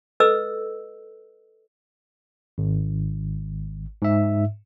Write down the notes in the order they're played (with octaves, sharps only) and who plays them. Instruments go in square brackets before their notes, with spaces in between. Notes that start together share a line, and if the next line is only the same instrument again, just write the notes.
[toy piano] A4 B4 D#5 E6
[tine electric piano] G#1
G#2 E5